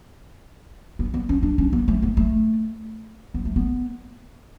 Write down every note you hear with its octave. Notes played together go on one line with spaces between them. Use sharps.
B3
B3
C#4
D4
C#4
B3
A3
B3
A3
B3
A3
B3